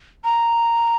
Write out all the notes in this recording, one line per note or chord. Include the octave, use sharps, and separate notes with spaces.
A#5